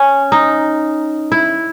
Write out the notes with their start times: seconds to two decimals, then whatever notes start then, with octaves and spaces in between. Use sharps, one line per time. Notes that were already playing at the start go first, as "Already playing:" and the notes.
Already playing: C#4
0.32 D#4
1.32 E4